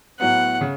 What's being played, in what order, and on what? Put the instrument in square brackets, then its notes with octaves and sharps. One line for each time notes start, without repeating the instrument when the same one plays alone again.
[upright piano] A2 F#3 B3 [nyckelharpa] F#5
[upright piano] C#3